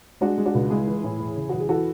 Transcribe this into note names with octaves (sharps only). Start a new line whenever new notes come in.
G#3 D4 F#4
G#3
D4 F#4
C#2
G#3 E4 G#4
E3
A2
E2
C#3
E2 F#4
G#4
E3 F#4 A4